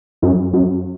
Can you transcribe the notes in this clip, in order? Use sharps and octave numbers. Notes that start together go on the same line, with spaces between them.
F#2
F#2